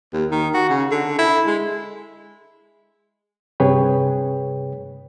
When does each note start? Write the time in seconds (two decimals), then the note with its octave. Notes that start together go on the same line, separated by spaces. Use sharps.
0.13 D#2
0.32 D#3
0.54 F#4
0.69 C#3
0.91 D3
1.18 E4
1.47 G#3
3.60 G2 C3 G#4 B4 C#5 G5